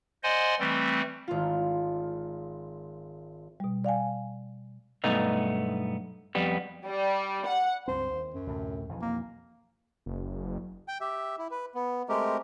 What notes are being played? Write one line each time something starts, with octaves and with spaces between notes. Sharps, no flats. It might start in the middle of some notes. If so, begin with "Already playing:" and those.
C5 D5 D#5 F#5 G#5 C6
E3 G3 A3 C4
G#1 F4
B2 G3
D5 F5 G5 G#5
B1 G2 A3 B3 D#4
F2 G3 B3
G3
F#5
C#2 G2 C4 C5
D#2
F#2
D2 A2 C3
B1 F2 E3
A#3
F#1
G5
G4 E5
E4
B4
B3
G#3 A3 C4 G4 A#4